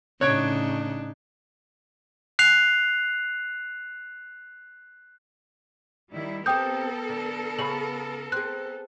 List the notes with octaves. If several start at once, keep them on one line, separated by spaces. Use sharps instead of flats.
A2 C#3 D4 D#4 C#5 F#6 G#6 D7
F#6 C7 F7
D#3 G3 E4
B3 C4 G4 A4 A#4 G5 D#6 G6
D3
C#3 G#4 C#5 B5 F#7
C4 G#4 F#6